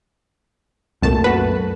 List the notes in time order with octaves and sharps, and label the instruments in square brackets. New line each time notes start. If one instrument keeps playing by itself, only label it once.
[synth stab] C2 A5 [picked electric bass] F#2 A#2 A3
[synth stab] F#4 B4